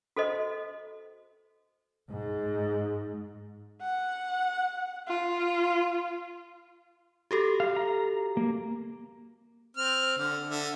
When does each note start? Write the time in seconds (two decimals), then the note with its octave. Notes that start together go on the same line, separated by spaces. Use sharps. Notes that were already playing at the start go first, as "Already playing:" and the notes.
0.16 F#4 A4 C5 D#5
2.10 G#2
3.82 F#5
5.08 F4
7.31 F#4 G4 A4
7.60 F5
7.77 A#5
8.37 A#3
9.77 C4 F6
10.18 D3
10.49 D3 E5